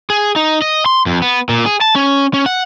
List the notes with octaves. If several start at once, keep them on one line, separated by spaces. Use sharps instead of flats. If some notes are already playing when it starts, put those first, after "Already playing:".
G#4
D#4
D#5
C6
F2
B3
A#2
G#4
A5
C#4
C#4
F#5